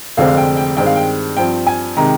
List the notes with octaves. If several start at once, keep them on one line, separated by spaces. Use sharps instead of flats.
F1 F2 D3 G#3 C4 F5
F5
G5
G5
G2 D#3 G#3 C4 G5
F5
G5
G2 F3 C4 G5
G#5
C3 D#3 G#3 A#5